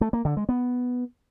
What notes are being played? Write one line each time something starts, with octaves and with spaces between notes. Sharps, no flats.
A3
A#3
D3
G#3
B3